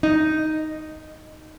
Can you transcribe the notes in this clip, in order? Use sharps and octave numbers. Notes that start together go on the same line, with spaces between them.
D#4